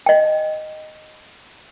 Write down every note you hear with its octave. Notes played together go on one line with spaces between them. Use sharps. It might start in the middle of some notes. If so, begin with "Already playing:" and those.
D#5 G5